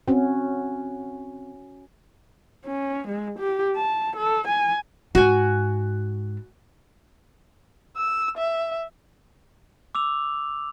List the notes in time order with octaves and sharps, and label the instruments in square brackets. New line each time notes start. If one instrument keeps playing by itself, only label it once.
[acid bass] C4 [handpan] C#4 F#4
[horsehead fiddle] C#4
G#3
G4
A5
A4
G#5
[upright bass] G#2 [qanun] F#4 G#5
[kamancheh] E6
E5
[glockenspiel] D6 E6 F7